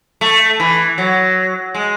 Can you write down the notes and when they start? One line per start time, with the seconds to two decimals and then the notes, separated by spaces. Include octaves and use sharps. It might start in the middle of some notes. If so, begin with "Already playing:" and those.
0.21 A3
0.60 E3
0.98 F#3
1.75 G#3